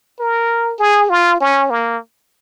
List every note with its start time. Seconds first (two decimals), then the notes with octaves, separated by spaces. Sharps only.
0.19 A#4
0.79 G#4
1.10 F4
1.40 C#4
1.70 A#3